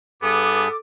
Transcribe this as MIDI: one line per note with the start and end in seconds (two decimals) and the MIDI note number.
0.22 0.68 43
0.22 0.66 59
0.22 0.68 68
0.22 0.77 69
0.22 0.77 86